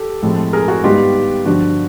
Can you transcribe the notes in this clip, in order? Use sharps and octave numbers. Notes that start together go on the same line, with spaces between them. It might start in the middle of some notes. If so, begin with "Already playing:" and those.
Already playing: G4 A4
A2 F3 G#3 C4
G#4 A#4
F#4 G#4
G#2 D#3 G3 B3 F4 G4
G2 D3 F3 F#4